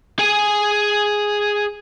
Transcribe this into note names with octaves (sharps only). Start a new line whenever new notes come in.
G#4 G#5